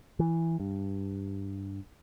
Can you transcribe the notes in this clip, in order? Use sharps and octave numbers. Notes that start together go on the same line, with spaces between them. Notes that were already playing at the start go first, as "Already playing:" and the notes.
E3
G2